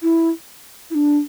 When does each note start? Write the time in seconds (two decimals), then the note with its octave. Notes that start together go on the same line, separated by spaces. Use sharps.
0.02 E4
0.90 E4
0.95 D4